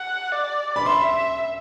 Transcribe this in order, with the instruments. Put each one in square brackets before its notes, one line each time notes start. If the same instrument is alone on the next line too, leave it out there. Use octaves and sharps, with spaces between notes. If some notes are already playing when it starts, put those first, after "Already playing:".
Already playing: [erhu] F#5
D5
[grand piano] B5
[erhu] E5 [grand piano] C6